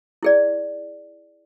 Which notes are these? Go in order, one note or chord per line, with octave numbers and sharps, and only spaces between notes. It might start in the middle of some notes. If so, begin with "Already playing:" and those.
E4 G#4 D5